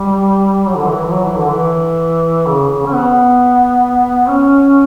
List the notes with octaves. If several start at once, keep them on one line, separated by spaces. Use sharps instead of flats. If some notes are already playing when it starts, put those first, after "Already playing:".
Already playing: G3
F#3
D3
E3
F#3
E3
D3
E3
C#3
C#3
C#4
B3
C#4